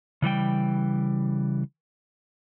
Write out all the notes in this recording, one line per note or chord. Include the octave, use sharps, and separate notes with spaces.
C#3 E3 G3 G5